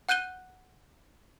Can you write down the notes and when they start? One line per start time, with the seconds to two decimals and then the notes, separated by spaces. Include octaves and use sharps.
0.09 F#5 F#6 G6 D#7 G7